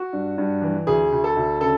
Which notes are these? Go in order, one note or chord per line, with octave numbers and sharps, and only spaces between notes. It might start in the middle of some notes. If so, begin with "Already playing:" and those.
Already playing: F#4
G2
G2
E3
D2 G#4
D2
A4
D2
C#3 A4